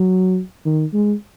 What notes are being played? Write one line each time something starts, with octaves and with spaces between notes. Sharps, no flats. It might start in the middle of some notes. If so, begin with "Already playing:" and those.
Already playing: F#3
D#3
G#3